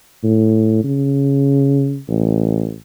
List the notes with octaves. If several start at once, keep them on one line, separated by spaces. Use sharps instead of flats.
A2
C#3
A1